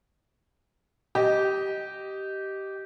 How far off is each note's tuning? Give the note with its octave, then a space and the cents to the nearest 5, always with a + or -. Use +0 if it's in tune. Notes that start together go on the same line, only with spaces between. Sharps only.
G4 -15 D#5 +0